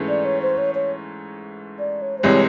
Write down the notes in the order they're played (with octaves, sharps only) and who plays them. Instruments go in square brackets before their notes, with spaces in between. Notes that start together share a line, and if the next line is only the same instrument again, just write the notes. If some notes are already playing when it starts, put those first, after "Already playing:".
Already playing: [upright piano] G#2 E3 A3 C#4
[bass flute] D5
C#5
C5
C#5
C#5
D5
C#5
C5
[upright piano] C2 C3 E3 G#3 [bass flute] C#5